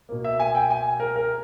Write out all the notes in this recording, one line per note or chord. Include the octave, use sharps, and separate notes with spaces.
B2 A#3
E5
G#5
G5
G#5
A#4
A#4